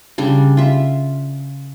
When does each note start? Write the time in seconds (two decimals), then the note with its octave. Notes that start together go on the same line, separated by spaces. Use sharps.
0.18 C#3 G3 D4
0.57 F4 E5